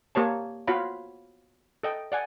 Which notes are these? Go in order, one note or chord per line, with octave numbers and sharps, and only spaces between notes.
A#3 G4 C#5 A5
B3 F4 F#4 C#5 F5 B5
A4 D#5 G5
D5 F#5 G#5